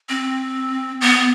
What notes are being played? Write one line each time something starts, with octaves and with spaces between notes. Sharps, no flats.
C4
B3